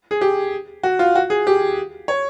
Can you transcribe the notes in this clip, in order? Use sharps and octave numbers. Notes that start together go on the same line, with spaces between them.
G#4
G4
F#4
F4
F#4
G#4
G4
C#5